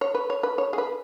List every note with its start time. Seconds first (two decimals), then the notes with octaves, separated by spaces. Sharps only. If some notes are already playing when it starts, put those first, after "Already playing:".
0.01 C#5
0.15 B4
0.30 C#5
0.43 B4
0.58 C#5
0.73 G#4
0.78 B4